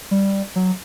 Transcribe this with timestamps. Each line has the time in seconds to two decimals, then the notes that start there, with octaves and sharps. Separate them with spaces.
0.11 G3
0.56 F#3